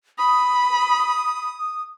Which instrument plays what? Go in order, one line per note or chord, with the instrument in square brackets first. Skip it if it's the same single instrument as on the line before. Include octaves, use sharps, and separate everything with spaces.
[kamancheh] B5 [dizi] D#6